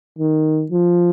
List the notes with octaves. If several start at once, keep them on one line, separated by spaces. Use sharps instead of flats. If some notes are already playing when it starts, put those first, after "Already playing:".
D#3
F3